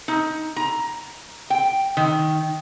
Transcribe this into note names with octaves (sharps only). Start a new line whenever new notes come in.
D#4
A#5
G5
D#3